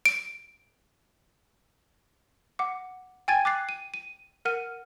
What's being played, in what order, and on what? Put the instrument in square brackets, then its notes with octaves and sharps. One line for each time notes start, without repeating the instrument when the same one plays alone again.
[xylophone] D7
F#5 D6
G5 G#5 G#6 A6 D#7
D6 F#6 A6 C7
D#7
D#7
A#4 F#5 F6 D#7